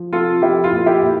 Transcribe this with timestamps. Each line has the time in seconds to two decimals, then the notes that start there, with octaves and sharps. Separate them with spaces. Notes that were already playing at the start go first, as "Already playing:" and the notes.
Already playing: F3
0.13 C3 F4 A4
0.42 F3 E4 G4
0.64 F4
0.72 A#2
0.78 F4
0.86 E4 G4
1.02 A#2